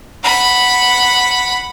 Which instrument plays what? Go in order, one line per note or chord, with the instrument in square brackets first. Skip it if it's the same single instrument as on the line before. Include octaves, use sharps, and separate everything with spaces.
[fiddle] F#5 B5